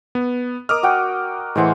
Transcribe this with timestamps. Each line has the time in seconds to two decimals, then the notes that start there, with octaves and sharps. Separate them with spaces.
0.15 B3
0.69 A#4 D#5 D6 D#6 F6
0.83 F#4 F#5 G5
1.56 A2 E3 G#3 C5 F#5